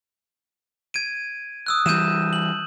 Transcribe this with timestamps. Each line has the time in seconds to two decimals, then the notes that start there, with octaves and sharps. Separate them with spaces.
0.94 G#6 D7 D#7
1.66 D#6 E6 F#6
1.86 E3 G3 G6 D#7 E7
2.33 F#7